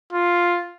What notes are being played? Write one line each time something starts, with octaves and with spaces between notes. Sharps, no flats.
F4